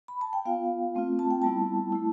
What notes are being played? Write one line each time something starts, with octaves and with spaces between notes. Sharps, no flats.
B5
A5
G5
B3 F4 F5
A3 C4 F4
A5
G5
G3 B3 E4 A5
A3 E4